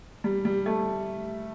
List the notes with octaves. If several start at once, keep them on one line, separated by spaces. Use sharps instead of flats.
G3
G3
A3